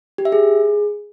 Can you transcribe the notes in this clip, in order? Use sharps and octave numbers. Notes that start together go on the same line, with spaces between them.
G4
E5
G#4